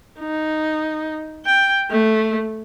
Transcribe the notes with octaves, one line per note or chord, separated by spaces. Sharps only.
D#4
G5
A3